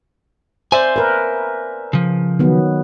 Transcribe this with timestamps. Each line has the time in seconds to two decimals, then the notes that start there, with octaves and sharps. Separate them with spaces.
0.72 C5 D5 E5 G#5
0.96 A#4 B4
1.93 C#3 F3
2.39 D#3 F#3 B3